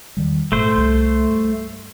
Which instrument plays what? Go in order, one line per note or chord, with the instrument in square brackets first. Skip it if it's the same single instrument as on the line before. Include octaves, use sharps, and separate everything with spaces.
[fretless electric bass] E2 D#3 G3
[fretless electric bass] G#1 A#2 [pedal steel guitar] A3 C5
[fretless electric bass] C2
G2